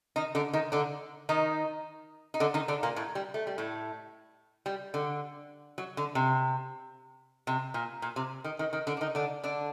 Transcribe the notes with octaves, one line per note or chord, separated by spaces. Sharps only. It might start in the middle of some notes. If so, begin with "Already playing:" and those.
D#3 D#4
D3 D4
D#3 D#4
D3 D4
D#3 D#4
D#4
D3 D4
D#3 D#4
D3 D4
A#2 A#3
A2 A3
G3
A3
G3
A2 A3
G3
D3
F#3
D3
C3
C3
A#2
A#2
C3
D#3
D#3
D#3
D3 D4
D4
D#3 D#4
D3 D4
D3 D4